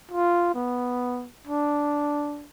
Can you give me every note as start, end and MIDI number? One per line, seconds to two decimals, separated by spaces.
0.12 0.54 65
0.55 1.28 59
1.48 2.48 62